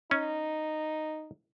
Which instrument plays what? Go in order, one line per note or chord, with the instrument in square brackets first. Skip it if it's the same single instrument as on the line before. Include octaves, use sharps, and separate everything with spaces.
[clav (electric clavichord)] C#4 [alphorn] D#4